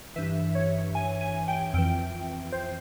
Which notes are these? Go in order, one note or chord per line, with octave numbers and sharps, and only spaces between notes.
G2 E3 E5
C#5
G#5
G#5
G5
F2 E3 G5
C5